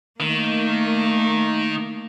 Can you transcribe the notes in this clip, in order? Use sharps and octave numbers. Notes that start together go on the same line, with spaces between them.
D#3 A3 A#3